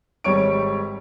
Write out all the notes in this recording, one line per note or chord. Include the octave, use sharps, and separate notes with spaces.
G#1 G3 C#5 C#6 D7